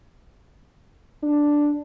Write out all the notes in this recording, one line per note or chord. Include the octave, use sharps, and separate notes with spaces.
D4